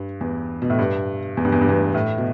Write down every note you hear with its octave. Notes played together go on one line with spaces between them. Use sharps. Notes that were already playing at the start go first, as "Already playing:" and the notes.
Already playing: G2
E2
B2
A2
G2
E2
G2
E2
G2
E2
A2
B2